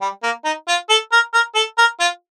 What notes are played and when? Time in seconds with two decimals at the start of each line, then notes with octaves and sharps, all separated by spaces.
0.01 G3
0.23 A#3
0.44 D#4
0.68 F4
0.90 A4
1.12 A#4
1.33 A#4
1.55 A4
1.78 A#4
2.00 F4